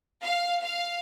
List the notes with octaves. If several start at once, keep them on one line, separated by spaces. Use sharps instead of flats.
F5
F5